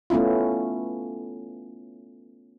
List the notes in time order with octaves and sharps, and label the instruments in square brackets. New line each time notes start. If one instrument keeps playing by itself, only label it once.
[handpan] A3 B3 C#4 E4 F4